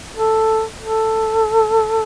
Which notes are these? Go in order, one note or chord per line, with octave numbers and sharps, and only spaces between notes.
A4
A4